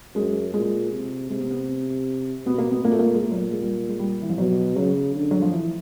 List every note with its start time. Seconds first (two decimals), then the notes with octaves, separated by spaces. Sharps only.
0.15 F#2 G#3
0.54 A#2 G#3
0.92 C3
1.30 C3 G#3
1.40 B3
1.50 B3
2.46 B2 B3
2.58 A#3
2.71 B3
2.84 A#2 A#3
2.92 A3
2.99 A#3
3.14 G#3
3.23 A#2 A3
3.32 F#3
3.52 G#3
3.61 G3
3.88 G#3
3.99 G3
4.22 E3
4.30 F3
4.38 B2 F#3
4.76 C#3 F#3
5.15 D3
5.31 F#3
5.42 F3
5.54 E3